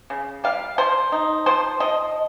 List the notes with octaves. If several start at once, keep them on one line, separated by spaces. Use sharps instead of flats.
C#3
G3 F5
F3 C5
D#4
F3 C5
F3 D#5